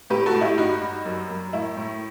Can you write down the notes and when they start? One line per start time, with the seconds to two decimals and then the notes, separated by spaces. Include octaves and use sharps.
0.10 A2 G4 B4
0.26 F#4 A4
0.34 A2
0.41 E4 G4
0.57 G2 D#4 F#4
0.81 G2
1.05 F#2
1.30 F#2
1.53 A2 E4
1.77 A2